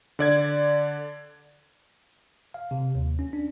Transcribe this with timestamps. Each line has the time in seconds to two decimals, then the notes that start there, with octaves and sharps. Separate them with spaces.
0.19 D3 D5 G#6
2.54 F5
2.71 C3
2.95 D#2
3.19 C#4
3.33 D4